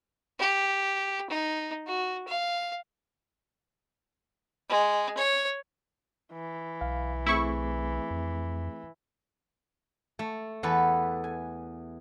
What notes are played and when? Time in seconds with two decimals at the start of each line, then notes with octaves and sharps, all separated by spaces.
0.39 G4
1.30 D#4
1.87 F#4
2.27 F5
4.69 G#3
5.17 C#5
6.33 E3
6.81 B1 F5
7.26 A3 C4 E4 G#4 C#6
8.10 F2
10.19 A3
10.63 E2 A4 B4 B5
11.24 G#5